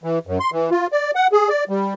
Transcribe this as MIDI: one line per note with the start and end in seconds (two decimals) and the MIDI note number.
0.04 0.19 52
0.27 0.39 42
0.40 0.50 84
0.52 0.70 52
0.71 0.87 65
0.92 1.11 74
1.15 1.27 78
1.32 1.49 68
1.49 1.64 74
1.69 1.94 55